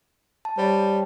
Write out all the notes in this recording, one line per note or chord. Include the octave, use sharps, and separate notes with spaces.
A5
G3 C5 C#5 A5